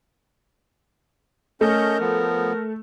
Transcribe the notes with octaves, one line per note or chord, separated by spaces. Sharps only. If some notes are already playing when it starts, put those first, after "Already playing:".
A3 C#4 A#4 D#5 G6
F3 B3